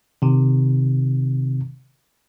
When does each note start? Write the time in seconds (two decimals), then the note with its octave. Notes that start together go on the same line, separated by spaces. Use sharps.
0.22 C3 D#3